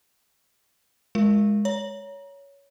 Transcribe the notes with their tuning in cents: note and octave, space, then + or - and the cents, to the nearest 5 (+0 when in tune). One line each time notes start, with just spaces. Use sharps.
G#3 +0 F4 +0 A#4 +0
C#5 +15 A#5 +20